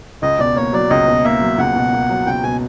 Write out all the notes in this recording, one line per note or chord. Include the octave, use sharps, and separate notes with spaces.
C#2 D#5
B2 D5
A#3 C#5
F#3 D5
C#2 D#5
B2
A#3 E5
F#3
C#2 F#5
B2
A#3
F#3
C#2 G5
B2 G#5